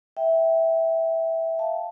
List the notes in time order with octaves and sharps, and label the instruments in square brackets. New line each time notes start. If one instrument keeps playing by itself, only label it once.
[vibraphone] E5 G5
F5 A5